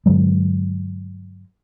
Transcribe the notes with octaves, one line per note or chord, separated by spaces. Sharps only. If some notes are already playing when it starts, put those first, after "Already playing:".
G2 D3 F#3 G#3